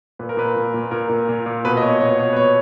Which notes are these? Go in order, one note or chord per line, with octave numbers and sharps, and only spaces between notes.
A#2 B4
A#4
A#2 B4
A#2
A#2
A#2 A#4
A#2
A#2
A#2
B2 B4
D#5
B2 C#5
B2 C#5
B2 C#5
B4
B2 C#5